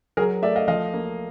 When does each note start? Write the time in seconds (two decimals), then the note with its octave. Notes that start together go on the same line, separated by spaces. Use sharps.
0.17 F#3 G#4 A#4
0.42 A3 D5 E5
0.56 D#5 F5
0.68 F3 D#5 F5
0.94 A#3